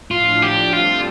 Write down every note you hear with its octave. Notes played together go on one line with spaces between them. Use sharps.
A2 F3 D4 F4
G4
G3 C4 F4 A4 C5